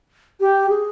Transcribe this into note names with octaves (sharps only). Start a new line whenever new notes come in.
G4
G#4